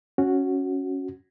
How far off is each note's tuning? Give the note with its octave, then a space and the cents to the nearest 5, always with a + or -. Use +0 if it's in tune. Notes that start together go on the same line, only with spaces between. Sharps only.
C#4 +0 F#4 +0